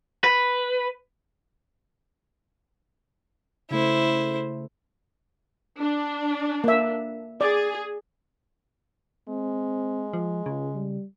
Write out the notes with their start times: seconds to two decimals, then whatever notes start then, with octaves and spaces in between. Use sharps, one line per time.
0.24 B4
3.71 C#3 A3 E4 C5
5.79 D4
6.64 A#3 E5
7.41 G#4 D5
9.28 G#3 C4
10.13 F3
10.46 C#2 C#3
10.75 G3